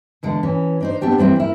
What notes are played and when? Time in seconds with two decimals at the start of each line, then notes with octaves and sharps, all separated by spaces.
0.23 E2 D3 G#3
0.43 E3 C#4
0.80 D4 D#4 C5
1.01 B3 C4 D4 G4
1.18 E3 G3 C4 E4
1.36 E4 A#4